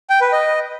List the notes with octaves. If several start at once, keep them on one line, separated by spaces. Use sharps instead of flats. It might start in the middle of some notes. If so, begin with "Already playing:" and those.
G5
B4
D#5